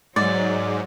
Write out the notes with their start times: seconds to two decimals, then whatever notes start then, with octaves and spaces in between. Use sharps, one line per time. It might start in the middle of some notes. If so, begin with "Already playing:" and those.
0.16 G#2 F#3 D5